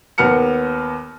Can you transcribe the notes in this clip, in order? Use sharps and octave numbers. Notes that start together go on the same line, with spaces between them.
D#2 B3 A#4 F6 C#7